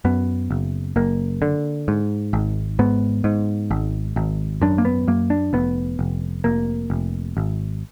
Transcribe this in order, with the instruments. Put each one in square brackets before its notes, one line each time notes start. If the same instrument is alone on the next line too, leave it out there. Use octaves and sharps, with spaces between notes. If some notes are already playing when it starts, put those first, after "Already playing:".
[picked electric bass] F#2 B3
F#1
F#1 A#3
D3
G#2
G#1
G#2 B3
G#2
G#1
G#1
F#2 D4
A#3
B3
F#2 A#3
D4
F1 B3
F1
F1 A#3
F1
G#1